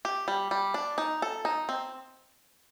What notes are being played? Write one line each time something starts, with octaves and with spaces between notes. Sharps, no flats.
G4
G3
G3
D4
D#4
A4
D#4
C4